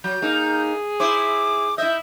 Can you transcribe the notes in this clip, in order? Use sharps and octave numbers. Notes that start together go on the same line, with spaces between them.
F#3 G6
A#3 D#4 G#4
E4 C5 D6
E4 D#5 E5 G6